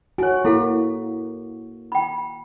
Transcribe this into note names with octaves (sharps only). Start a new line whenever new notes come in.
F#4 C#5 G#5
A#3 E4 A4 F5
G5 B5